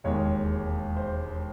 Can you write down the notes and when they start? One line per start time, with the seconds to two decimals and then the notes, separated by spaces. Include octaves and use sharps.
0.04 E1 D#2 D#3 G#3 C#5
0.96 C5